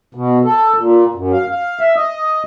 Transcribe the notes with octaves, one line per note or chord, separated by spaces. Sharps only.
B2
A4
A#2
F#2
F5
F5
E5
D#5